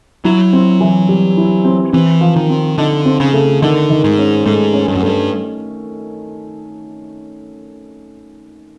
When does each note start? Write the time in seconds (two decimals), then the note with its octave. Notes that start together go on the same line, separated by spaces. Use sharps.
0.25 F#3 E4
0.53 C4
0.81 E3
1.09 G3
1.37 E4
1.65 C4
1.93 E3 C4
2.21 F3
2.36 D#3
2.50 C4
2.78 D3 D#4
3.05 C4
3.20 C#3
3.33 A3
3.62 D3 D#3
3.90 D#3
4.04 G#2
4.18 C#4
4.46 G#2 A3
4.74 C#4
4.88 G2
4.96 F#2
5.02 G2 A3